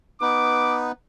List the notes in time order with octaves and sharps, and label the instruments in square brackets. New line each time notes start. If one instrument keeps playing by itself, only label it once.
[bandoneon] B3 D#4 B4 [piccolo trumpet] D6